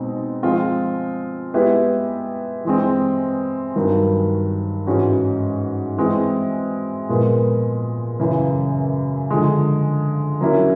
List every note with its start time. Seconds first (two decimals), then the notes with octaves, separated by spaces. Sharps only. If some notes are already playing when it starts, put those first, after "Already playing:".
Already playing: B2 G#3 C4 D#4
0.43 F3 G#3 C4 F4
1.54 G#3 B3 E4 G4 B4
2.65 E3 G#3 C4
3.75 G2 D#3 F#3
4.87 G#2 E3 G#3 C#4 F#4
5.97 E3 G#3 C4 E4
7.09 A#2 F3 G#3 B3
8.20 F#2 C#3 E3
9.30 D3 F3 G#3
10.41 F#3 A#3 C#4 E4